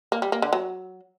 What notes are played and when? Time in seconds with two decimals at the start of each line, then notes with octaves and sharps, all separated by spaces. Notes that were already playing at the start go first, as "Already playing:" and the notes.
0.12 A#3
0.22 G3
0.32 A#3
0.42 D3
0.53 F#3